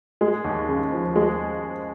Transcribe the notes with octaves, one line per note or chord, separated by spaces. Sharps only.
G#3
D#2
C#3
F3
G#3